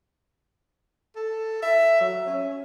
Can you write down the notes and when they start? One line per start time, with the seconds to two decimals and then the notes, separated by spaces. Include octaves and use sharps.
1.16 A4
1.62 E5
2.01 F#3
2.27 C#4